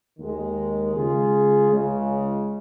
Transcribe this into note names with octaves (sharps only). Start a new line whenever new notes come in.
D#2 D#3 G#3
C#3 G#3 F4 G#4
C#2 C#3 G#3